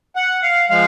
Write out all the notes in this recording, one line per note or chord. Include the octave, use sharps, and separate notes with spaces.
F#5
F5
F3 G#3 F5